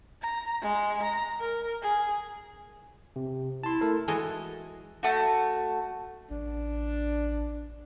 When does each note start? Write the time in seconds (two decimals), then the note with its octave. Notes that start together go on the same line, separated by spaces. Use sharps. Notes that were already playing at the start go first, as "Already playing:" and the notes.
0.22 A#5
0.62 G#3
1.03 A#5
1.40 A#4
1.83 G#4
3.16 C3
3.63 E4 A5 C6
3.81 A3 A4 A#4
4.08 E3 G#3 F#4 A4 D#5 G#5
5.03 A3 F#4
6.31 A1 D4